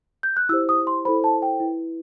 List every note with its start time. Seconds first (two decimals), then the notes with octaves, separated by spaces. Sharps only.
0.23 G6
0.37 F#6
0.49 E4 E6
0.52 G4 C5
0.69 D#6
0.87 C6
1.05 E4 A4 C5 B5
1.24 A5
1.42 G5
1.60 E4 B4